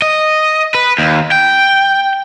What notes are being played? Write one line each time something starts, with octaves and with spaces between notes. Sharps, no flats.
D#5
B4
D#2
G5